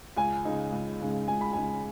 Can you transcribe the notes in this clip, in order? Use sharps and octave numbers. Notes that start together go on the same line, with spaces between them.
C#2 G#5
C#3 G#3 D#4
C#2
C#3 G#3 D#4
C#2 G#5
B5
C#3 G#3 D#4 G#5